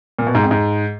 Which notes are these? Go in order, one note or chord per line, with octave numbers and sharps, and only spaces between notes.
A#2
B2
G#2
F2
G#2